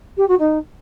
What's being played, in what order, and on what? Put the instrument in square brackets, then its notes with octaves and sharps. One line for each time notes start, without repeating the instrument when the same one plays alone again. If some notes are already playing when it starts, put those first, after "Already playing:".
[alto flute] G4
F#4
D#4